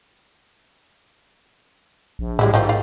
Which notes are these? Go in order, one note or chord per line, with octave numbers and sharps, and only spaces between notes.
A#1
A2 G3 G#3 E4
G#2 D#3 F3
D5 F5